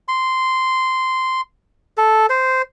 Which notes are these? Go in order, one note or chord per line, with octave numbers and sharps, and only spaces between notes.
C6
A4
C5